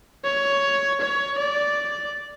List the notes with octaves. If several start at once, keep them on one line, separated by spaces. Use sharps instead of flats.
C#5
C#5
D5